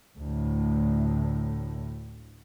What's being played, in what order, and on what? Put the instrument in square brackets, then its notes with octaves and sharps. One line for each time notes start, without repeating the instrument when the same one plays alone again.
[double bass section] D2 A2